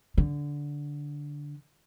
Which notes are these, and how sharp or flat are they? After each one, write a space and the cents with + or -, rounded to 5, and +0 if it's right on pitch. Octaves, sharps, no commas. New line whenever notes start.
D3 -10